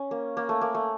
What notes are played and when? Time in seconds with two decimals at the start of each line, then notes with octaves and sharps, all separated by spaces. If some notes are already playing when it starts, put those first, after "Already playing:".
Already playing: C#4
0.11 A#3
0.37 A#3
0.49 A3
0.61 A#3
0.75 A3